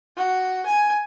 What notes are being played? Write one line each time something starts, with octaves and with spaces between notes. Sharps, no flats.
F#4
G#5